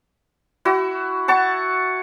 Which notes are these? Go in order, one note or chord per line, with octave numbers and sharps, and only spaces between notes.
E4 F#4
F#5 A5 C#6